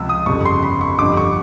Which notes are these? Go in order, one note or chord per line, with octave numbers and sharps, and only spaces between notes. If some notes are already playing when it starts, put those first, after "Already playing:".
Already playing: C#2 C3 F3 E6
D#6
G1 F2 C#3 C#6
C6
B5
C#6
G1 F2 D3 D6
C#6